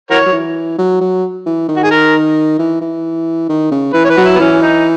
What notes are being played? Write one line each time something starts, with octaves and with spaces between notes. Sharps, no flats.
E3 F#4 A#4 C#5
F#3
E3
F#3
F#3
E3
D#3
F#4
G#4
A#4
E3
E3
D#3
C#3
E3 B4
C#5
B4
F#3 F#4
E4
B3
E3 C#4
D#4